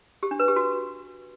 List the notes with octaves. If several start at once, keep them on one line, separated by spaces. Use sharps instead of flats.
G4
D4
B4
G4
F#4